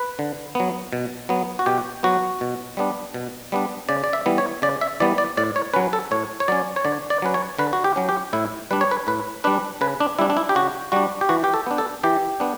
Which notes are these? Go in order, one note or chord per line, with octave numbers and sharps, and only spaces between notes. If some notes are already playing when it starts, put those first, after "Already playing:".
Already playing: B4
D3
F#3 B3
B2
F#3 B3
F#4
B2 G4
F#3 B3 F#4
B2
G3 B3 D4
B2
G3 B3 D4
C#3 D5
D5
E5
E3 G3 B3
C#5
C#3 D5
E5
E3 G3 B3 D5
D5
A2 D5
C#5
F#3 C#4 B4
A4
A2 C#5
C#5
F#3 C#4 D5
C#5
D3 D5
D5
F#3 C#4 B4
C#5
D3 B4
F#4
G4
F#3 C#4
G4
A2 E4
G3 D4 B4
C#5
B4
A2 B4
G3 D4 B4
C#3 B4
D4
G3 D4 E4
D4
E4
G4
C#3 F#4
G3 D4 F#4
G4
E3 F#4
G4
A4
B3 D4
A4
E3 G4
B3 D4